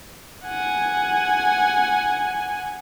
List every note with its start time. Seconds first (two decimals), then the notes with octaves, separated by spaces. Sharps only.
0.45 F#5 G#5